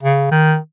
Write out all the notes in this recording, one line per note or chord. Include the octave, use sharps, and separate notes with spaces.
C#3
D#3